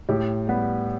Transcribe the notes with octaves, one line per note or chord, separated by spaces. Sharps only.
A2 G4
G3 B3